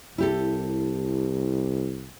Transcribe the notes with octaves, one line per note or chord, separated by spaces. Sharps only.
C2 E4 G4 A4